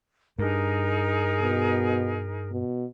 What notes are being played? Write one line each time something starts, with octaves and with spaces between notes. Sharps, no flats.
G2 D#4 G#4 A#4
B2
B2